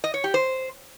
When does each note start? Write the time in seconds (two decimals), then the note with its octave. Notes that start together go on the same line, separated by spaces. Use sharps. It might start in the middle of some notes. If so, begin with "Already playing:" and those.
0.04 D#5
0.14 C#5
0.24 G4
0.34 C5